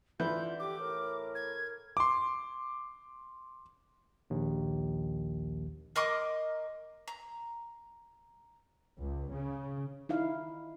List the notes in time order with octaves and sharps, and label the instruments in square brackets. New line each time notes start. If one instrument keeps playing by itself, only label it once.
[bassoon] D3 [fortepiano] E3 [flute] F4 [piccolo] G6
[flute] G4 [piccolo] D6
[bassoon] A2 [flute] A#4
[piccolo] G#6
[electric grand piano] C6 D6
[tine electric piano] A#1 D#2
[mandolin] A#4 D#5 C6 D6
A#5
[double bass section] C#2
C#3
[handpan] D#4 E4 F5